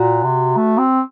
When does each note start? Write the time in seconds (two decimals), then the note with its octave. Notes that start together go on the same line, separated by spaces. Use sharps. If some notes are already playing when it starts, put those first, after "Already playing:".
Already playing: A#2 F#4
0.24 C3
0.57 A3
0.78 C4